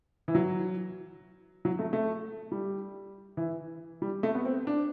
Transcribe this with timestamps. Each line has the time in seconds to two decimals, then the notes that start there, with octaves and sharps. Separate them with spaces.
0.28 E3
0.35 F#3
1.65 F#3
1.79 A3
1.93 A3
2.52 G3
3.37 E3
4.02 G3
4.23 A3
4.35 B3
4.45 C4
4.67 D4